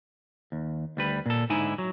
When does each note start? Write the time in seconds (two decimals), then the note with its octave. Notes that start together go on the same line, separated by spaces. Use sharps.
0.52 D#2
0.97 D2 G3 B4
1.26 A#2 A4
1.50 G#2 D3 D#4 E4 G#5
1.78 F#3